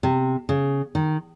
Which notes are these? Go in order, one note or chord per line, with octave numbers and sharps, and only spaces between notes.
C3
C#3
D#3